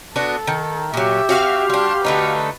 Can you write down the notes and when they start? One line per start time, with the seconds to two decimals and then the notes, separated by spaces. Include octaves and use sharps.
0.16 B3 D4 F#4 A4
0.47 D#3
0.94 A#2 F#3 G4 E5
1.29 C4 C#4 F#4 F5 F6
1.70 G3 D4 C6
2.05 D3 A3 D#4 B4